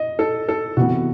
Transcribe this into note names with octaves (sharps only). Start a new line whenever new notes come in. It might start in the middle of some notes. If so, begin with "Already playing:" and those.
Already playing: D#5
A4
A4
C3 E3 B3 F#4